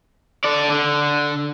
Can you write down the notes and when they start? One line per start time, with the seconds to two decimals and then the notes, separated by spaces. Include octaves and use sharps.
0.44 A4 D5
0.69 D3